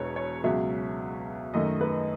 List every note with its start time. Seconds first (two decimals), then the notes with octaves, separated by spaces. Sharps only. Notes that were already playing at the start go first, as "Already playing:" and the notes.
Already playing: E1 E2 B2 B4 C#5
0.16 C#5
0.44 C#2 B2 F#3 E5
1.54 F#2 D#3 A3 D#5
1.81 B4